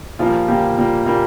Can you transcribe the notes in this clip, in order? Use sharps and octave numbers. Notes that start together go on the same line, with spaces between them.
A#2 F3 G3 A#3 F4
A#2 G3 A#3 G4
A#2 G3 A#3
A#2 G3 A#3